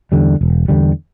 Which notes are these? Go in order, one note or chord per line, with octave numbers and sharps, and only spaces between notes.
E2 D3 G3
E1
E2 D3 G3